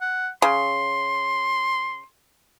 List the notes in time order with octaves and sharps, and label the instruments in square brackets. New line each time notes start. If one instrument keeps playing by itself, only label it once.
[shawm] F#5
[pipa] C#3 [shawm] C6